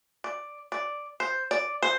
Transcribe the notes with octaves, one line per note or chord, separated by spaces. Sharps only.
D5
D5
C5
D5
C5